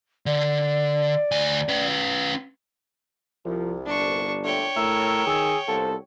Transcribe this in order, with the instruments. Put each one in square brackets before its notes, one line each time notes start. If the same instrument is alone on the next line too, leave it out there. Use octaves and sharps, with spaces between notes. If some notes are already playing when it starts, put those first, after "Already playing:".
[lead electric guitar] D3 [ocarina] D5
[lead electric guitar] D2 G#5
C#4 B4
[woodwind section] C2 [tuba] F3
[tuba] G1 [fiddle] D4 C#6
[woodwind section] A#2 D3 A3 [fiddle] C#5 G5
[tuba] A2 [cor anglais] A#4 [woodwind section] E6
[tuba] D#3 [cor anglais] G#4
[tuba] C2 [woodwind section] B3 F4 C5 [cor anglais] A4